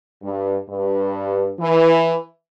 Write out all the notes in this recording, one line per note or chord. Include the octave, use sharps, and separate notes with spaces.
G2
G2
E3